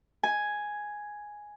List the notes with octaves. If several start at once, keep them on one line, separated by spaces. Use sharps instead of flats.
G#5